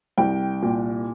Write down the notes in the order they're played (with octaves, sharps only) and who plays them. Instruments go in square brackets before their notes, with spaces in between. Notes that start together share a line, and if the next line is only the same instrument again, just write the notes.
[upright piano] C2 G5
A#2